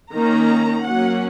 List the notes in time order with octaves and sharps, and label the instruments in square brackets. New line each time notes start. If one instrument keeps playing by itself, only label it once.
[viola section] D#3 A#3 C#4 A#5
F#3 A#3 C#4 F#5